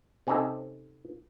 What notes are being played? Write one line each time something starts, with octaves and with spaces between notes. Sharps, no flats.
C3 C4 C#4 D#4 G4 A4